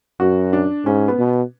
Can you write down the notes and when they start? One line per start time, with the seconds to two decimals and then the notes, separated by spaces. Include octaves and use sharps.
0.20 F#2 F#4
0.53 D4
0.85 G#2 C#4
1.08 B3
1.19 B2